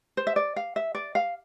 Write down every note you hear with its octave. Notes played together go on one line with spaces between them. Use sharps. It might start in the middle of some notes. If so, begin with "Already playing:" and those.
C5
E5
D5
F5
E5
D5
F5